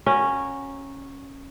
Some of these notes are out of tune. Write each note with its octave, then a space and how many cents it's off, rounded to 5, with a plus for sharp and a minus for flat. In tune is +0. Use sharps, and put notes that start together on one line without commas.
C#4 -10 F#4 -5 A#4 +0